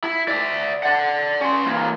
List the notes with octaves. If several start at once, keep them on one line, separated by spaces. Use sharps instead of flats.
E4
D5 E5
D5 F#5
C#4 C6
E3 A#3